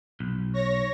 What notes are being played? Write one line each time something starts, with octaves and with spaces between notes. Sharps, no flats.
B1
C#5 A#6